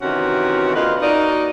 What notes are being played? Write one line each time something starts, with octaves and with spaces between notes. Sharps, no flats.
C3 D#3 E3 C#4 F#4
F2 D3 A#3 F4 B4 D#5
A#3 D#4 F#4 A#4 D5